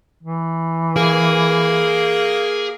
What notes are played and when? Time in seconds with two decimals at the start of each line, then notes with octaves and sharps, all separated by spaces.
0.23 E3
0.96 A#3 G#4